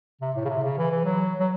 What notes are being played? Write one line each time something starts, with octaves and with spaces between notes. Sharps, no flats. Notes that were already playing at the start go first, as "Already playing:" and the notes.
C3
A2
C#3
C3
C#3
E3
E3
F#3
F#3